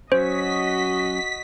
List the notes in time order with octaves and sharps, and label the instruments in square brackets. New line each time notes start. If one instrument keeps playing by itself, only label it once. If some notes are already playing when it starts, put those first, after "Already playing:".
[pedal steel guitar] F#3 C#4 [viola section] F#4 D#5 [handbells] C5 [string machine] B6